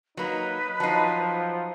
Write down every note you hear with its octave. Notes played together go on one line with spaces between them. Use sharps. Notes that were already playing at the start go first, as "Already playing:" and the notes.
F#3 A#3 D#4 B4
F3 F#3 D#4 A5 C7